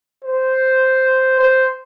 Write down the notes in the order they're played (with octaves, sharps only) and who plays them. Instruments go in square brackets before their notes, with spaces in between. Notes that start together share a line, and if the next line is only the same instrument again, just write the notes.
[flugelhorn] C5
C5